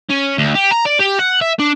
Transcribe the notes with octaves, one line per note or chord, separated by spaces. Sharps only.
C#4
D2
G4
A#5
D5
G4
F#5
E5
D4